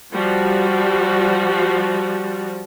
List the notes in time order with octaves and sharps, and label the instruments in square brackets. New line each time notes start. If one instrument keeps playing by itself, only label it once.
[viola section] F3 G3 F#4